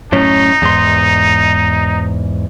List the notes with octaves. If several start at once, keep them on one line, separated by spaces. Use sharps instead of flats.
F#2 A2 C#4 D#4
E2 G#2 C6